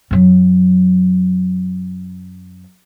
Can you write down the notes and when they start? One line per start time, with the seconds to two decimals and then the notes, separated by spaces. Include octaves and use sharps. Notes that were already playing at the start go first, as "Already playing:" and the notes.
0.11 F#2 F#3